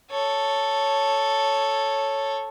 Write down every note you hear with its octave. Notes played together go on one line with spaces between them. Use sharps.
A4 C#5